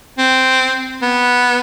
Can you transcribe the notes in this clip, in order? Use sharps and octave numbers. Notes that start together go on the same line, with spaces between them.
C4
B3